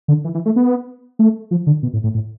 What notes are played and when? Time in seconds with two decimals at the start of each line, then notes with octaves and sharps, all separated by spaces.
0.08 D3
0.24 E3
0.35 E3
0.46 A3
0.56 B3
1.19 A3
1.51 F3
1.67 D3
1.83 B2
1.93 A2
2.03 A2
2.14 A2